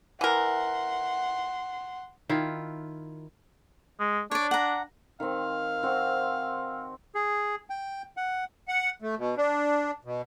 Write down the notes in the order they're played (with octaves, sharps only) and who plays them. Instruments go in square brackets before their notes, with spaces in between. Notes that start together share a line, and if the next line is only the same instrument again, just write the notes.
[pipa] E3 A#4 [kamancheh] F#5 C6
[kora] D#3 E4 F4
[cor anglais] G#3
[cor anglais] D4 [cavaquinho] C#5 D5
[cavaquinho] F#5 A#5
[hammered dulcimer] D#3 C4 [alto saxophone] F5
[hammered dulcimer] C4 F#4
[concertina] G#4
G5
F#5
[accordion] F#5
A3
B2
D4
B2